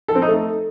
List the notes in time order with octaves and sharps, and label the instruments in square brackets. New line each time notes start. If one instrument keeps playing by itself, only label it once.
[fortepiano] A4
C4
D#4
A3